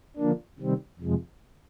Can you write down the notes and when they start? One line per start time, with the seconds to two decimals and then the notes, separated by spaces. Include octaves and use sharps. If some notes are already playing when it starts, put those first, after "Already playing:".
0.17 D3 F3 A#3 D4
0.59 C3 D#3 G3 C4
1.00 F2 C3 F3 G#3